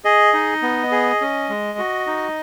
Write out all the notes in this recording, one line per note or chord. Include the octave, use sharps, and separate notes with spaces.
G#4 D#5
D#4
B3
G#4
C#4
G#3
F#4
D#4